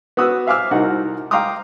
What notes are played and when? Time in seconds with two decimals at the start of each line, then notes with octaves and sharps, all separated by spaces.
0.17 B3 F#4 D#6 E6 F#6
0.47 E5 F5 G#5 D6 E6 F6
0.71 C2 D#4 F#4 A#4 F#5
1.31 F5 G5 A#5 C6 D6 D#6